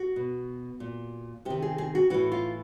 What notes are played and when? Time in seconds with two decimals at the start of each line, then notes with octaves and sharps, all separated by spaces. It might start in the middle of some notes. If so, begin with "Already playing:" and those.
Already playing: F#4
0.16 B2
0.80 A#2
1.45 C3 D#3 G4
1.62 G#4
1.78 G#4
1.95 F#4
2.10 A2 E3 F#4
2.32 F4